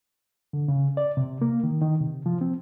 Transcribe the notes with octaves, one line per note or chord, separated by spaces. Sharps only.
D3
C#3
D5
C3
A#3
D#3
D#3
C3
F3
C4